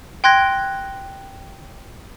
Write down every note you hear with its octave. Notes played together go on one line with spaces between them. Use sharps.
G5 C6 F#6 G#6 A#6